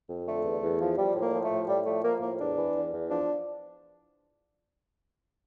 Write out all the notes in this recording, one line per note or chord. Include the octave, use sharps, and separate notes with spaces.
F2
D3 A3
E2
E2
F3
F3 G3
A2
A#3
F3
A3
A2
A2 G3
F3 A3
F3 A#3
A2 A#3
E2 D4
E3
E2
E2
F3 D4